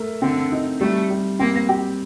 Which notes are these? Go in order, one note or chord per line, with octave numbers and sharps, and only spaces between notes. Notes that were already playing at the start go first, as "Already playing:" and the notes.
Already playing: A3 A#4
D3 C4
D#4
G3 A3
G3
A#3 C4
G4